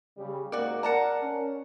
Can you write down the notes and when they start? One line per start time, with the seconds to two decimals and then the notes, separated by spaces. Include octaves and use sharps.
0.17 C#3 G3
0.52 G#2 A#3 F#4 D5
0.83 A#4 D5 F#5 A5 A#5
1.22 C#4